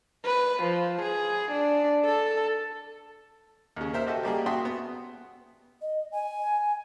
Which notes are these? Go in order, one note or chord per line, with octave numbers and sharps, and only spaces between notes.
B4
F3
G#4
D4
A4
D#2 C#3
A#4 C5 E5
F#4 G4 A4 D#5 E5
G3 A#3 G4 G#4
F#4 E5 G5 A5 C6 D#6
B3
D#5
G#5